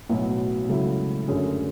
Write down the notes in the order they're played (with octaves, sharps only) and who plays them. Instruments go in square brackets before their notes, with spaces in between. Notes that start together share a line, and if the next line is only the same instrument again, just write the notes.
[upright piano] B1 A2 F#3 B3
C#2 C#3 F#3 A3 E4
F#2 D3 A3 C#4 G#4